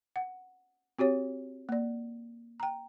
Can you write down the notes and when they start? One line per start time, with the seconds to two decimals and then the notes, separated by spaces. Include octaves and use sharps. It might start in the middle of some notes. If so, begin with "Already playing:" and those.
0.16 F#5
0.99 C4 F#4 G4 C#5
1.69 A#3 D5
2.60 G5 A#5